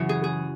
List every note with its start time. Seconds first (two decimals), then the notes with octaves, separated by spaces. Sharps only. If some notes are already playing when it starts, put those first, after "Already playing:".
Already playing: F#2 C#3 E3 E4 F#4
0.09 G#4
0.24 G#4